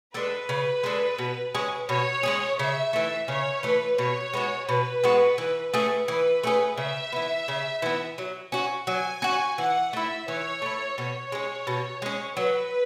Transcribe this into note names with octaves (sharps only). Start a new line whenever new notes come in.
G#3 D4 A4 B4
C#3
G#3 D4 A4
B2
G#3 C#4 G#4
B2 C#5
G#3 C#4 G#4
C#3 E5
E3 A3
C#3 C#5
E3 A3 B4
B2 C#5
G#3 B3 F#4
B2 B4
G#3 B3 F#4
E3
A3 C#4 G#4
E3 B4
A3 C#4 G#4
C#3 E5
E3 B3
C#3
E3 B3
F#3
C#4 F#4
F#3 G#5
C#4 F#4
E3 F#5
A3 E4 E5
E3 C#5
A3 E4
B2 C#5
G#3 C#4
B2
G#3 C#4
F#3 B4